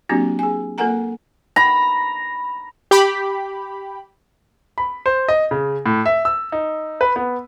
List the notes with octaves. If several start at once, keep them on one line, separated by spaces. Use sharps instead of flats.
F#3 A#3 C4 D4 F#4 G4
G#4 G#5
A#3 A4 A#4 F#5 G#5 A#5
A#5 B5
G4 B5
B5
C5
D#5
C#3
A2
E5
E6
D#4
B4
B3